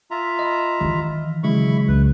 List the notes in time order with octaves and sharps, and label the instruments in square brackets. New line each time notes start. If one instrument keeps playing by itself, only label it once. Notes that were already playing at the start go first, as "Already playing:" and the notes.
[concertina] F4 E5 A#5
[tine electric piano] D#5 B5
[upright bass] D#3 E3
[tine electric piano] C#3 F#3 G#3 [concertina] E4 B5 C#6
[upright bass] C#2 [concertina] B4